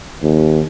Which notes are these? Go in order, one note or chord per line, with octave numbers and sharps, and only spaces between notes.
D#2